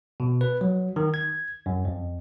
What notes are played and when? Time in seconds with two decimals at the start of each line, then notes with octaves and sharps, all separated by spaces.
0.20 B2
0.41 B4
0.61 F#3
0.96 D#3
1.14 G#6
1.66 F#2
1.85 F2